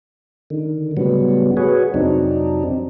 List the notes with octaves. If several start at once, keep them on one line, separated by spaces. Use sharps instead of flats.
D3 D#3
A2 C#3 F#3 G3 B3
F#4 G#4 B4 C#5
F2 C3 F#3 C4 D4 D#4